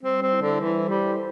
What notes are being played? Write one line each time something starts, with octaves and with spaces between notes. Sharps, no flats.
G3 C4
C4
E4 A4 C5
D3
E3 G3
G3 E4 A4 C5